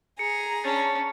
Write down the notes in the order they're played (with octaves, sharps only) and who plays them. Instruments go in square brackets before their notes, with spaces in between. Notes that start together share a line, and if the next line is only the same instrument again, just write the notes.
[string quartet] G#4 A#5 [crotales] C#7
[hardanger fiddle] C#4 D4